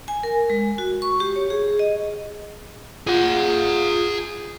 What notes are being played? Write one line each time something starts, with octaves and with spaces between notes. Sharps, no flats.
G#5
A#4
G#3
F#4
C#6
G4
C#5
G#4
D#5
F4 G#4 F#5